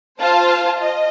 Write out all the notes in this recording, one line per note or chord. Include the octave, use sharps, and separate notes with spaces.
F4 C5 F5 A5
D#5